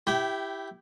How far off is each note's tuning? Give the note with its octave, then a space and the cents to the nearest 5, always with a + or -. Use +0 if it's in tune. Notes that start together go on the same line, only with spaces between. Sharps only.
E4 +0 G4 +0 G5 -25